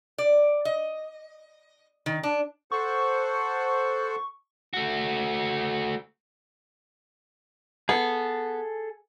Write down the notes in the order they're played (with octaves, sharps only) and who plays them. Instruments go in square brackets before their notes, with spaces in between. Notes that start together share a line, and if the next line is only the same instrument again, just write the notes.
[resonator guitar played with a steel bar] D5
D#5
D#3
D4
[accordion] A4 C5 F#5 [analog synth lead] C#6
[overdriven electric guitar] A3 F#4
[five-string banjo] B3 [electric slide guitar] G#4 A4